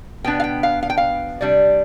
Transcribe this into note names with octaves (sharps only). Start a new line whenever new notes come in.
B2 B3 D4 G5
F5
G5
F5
F5
G5
F5
C3 G3 D4 D5